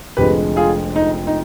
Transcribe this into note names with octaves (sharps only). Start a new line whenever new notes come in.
F1 F2 D3 G#3 G4 B4
F4 G#4
D#4
D#4